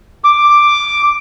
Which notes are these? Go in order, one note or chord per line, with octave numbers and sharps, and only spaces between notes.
D6